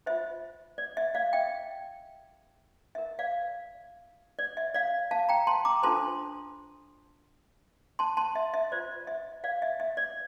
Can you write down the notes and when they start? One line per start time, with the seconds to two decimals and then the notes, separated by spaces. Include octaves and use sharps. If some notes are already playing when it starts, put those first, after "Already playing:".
0.06 F4 C5 E5
0.78 D5
0.97 E5
1.15 D5 F5
1.33 E5 G5
2.95 E4 A#4 E5
3.19 D5 F5
4.39 D5
4.57 E5
4.74 D5 F5
5.11 F5 A5
5.29 G5 A#5
5.47 A5 C6
5.65 A#5 D6
5.83 D4 F4 A4 C5 A5 C6
7.99 A5 C6
8.17 A5 C6
8.35 E5
8.54 E5
8.72 F4 C5 D5
9.07 E5
9.44 D5 F5
9.62 E5
9.80 E5
9.97 D5